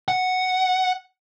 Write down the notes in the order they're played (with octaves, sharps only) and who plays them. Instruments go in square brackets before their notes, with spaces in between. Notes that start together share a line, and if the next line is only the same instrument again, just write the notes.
[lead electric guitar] F#5